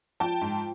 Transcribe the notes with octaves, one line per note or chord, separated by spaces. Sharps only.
F3 G5 A5
G#2